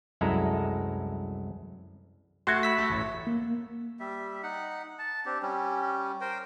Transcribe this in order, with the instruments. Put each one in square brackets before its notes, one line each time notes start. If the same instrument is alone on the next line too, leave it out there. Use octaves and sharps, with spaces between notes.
[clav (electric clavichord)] C2 F#2 G#3 E4 A4 A#5
[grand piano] A3 G#6 [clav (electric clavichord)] F#4 [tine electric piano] C6
[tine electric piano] B5 E6 B6
[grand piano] A3
A1
[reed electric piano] A#3
[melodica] G3 E5
D#4 F#5
A5
C4 D4 G4
G3 C#4
A#4 C5 G5